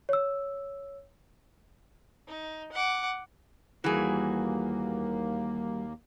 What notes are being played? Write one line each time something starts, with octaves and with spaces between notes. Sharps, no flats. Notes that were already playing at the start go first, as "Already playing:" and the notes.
C#5 E6
D#4
F#5 D6
D#2 E3 G3 A#3 F#4 G#4